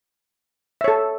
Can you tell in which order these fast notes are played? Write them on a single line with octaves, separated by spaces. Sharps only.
E5 C#5 A4